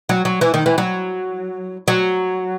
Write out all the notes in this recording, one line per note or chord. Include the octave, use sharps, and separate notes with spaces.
F#3
F#3
E3
D#3
E3
F#3
F#3